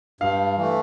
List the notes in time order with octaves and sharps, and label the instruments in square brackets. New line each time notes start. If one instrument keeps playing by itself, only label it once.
[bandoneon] G2 [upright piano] F5
[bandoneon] E3 A3